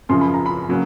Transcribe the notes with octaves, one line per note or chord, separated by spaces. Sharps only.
F#2 C#3 F3 C6
B5
A#5
B5
C#3 F#3 A#3